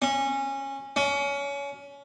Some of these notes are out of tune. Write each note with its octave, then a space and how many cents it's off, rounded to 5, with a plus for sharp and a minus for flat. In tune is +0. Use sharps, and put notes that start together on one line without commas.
C#4 -20
C#4 +25